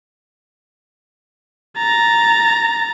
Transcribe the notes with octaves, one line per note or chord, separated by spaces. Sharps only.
A#5 A6